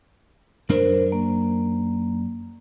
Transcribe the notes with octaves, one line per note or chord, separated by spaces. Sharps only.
F#2 D4 A#4 C5
A#3